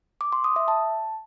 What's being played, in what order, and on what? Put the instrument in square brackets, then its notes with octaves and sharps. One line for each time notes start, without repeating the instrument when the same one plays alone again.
[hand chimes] D6
C6
D#6
E5
A5